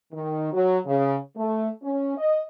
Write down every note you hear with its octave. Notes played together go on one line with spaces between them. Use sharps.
D#3
F#3
C#3
A3
C#4
D#5